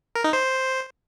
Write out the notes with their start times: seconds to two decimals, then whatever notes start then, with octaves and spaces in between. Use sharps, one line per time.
0.15 A#4
0.24 D#4
0.33 C5